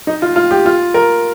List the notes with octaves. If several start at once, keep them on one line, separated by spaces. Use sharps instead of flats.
D#4
F4
F4
G4
F4
A#4